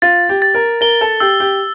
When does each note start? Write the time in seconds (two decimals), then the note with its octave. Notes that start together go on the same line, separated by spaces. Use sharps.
0.02 F4 A6
0.29 G4
0.42 A6
0.54 A#4
0.81 A#4 G7
1.01 A4
1.20 G4 E6
1.40 G4